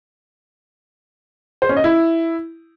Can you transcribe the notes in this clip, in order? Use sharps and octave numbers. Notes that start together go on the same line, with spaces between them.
C5
C#4
D#5
E4